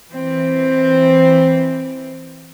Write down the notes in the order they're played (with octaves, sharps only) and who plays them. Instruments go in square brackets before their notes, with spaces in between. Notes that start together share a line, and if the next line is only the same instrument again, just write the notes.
[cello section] E3 C4